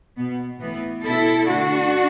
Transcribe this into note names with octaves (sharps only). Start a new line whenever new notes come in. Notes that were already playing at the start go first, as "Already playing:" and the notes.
B2 B3
A2 E3 B3
B2 B3 E4 A4
D3 A3 D4 F#4